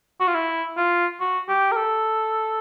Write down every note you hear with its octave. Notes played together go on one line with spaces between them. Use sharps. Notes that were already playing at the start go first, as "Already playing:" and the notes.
F#4
F4
E4
F4
F#4
G4
A#4
A4